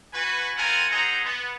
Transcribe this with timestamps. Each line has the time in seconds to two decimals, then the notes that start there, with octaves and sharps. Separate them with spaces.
0.14 F#4 B4 G#5
0.56 B3 C4 F4 A#4 F#5 G#5
0.90 C4 D#4 G#4 C5 F#5 A#5
1.24 B3